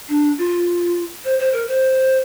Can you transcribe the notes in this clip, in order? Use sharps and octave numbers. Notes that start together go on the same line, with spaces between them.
D4
F4
C5
C5
A#4
C5